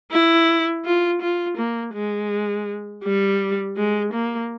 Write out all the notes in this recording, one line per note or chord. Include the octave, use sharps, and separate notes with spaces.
E4
F4
F4
A#3
G#3
G3
G#3
A#3